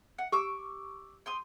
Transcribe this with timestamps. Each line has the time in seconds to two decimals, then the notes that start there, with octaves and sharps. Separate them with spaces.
0.18 F#5
0.32 G4 C#6 D6 E6
1.26 G5 C6 D#6